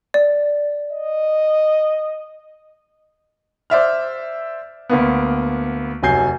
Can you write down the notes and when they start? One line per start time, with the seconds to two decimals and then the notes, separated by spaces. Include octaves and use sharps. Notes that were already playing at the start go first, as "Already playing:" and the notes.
0.14 D5
0.92 D#5
3.70 C5 D5 E5 F6
4.90 D2 A#3 B3
6.03 F1 F#3 G#5 G6 C7